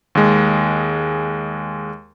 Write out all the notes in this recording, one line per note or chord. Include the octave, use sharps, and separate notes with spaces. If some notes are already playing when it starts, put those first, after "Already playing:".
D#2 G#3